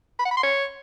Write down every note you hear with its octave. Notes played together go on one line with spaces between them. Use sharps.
B5
F#5
B5
C6
C#5